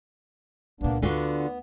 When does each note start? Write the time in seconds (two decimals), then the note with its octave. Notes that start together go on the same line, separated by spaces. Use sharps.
0.81 C#2 A#2 A#3 B3 D4
1.02 D2 D3 B3 F4 F#4